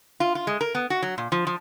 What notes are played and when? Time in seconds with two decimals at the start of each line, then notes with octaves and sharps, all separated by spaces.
0.20 F4
0.35 F4
0.47 G#3
0.61 A#4
0.75 B3
0.90 F#4
1.02 F#3
1.18 A#2
1.32 F3
1.47 F3